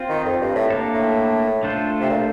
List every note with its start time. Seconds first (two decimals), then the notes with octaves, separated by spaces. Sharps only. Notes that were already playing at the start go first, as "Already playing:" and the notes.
Already playing: C4 F4 C5
0.09 D#3
0.24 F2
0.40 G2
0.55 A2
0.70 A#3 D4 A4
0.94 A2
1.63 A3 D4 F4 A4 C5
2.00 C3
2.09 A#2